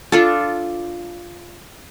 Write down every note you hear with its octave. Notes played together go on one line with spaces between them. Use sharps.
D4 F4 A4